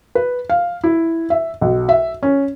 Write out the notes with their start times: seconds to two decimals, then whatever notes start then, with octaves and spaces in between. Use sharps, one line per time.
0.15 B4
0.50 F5
0.84 E4
1.30 E5
1.61 B1
1.89 E5
2.23 C#4